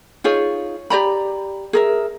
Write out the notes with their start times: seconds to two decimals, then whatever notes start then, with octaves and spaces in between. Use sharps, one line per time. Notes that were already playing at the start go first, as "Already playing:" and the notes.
0.24 D#4 F4 G#4 C#5
0.90 G4 D5 A#5 B5
1.73 G#4 A#4 E5